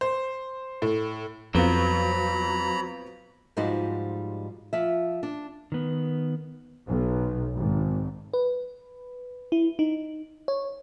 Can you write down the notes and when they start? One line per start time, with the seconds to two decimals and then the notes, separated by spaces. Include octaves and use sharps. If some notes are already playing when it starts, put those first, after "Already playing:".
0.01 C5
0.82 A2
1.55 F2 F#3 B3 C4 F4 A#5 B5
3.57 G#2 F3 G3 D#4 F#4 C5
4.73 F3 E5
5.23 D4
5.72 D#3 B3
6.87 B1
7.56 G#1
8.34 B4
9.52 E4
9.79 D#4
10.48 C#5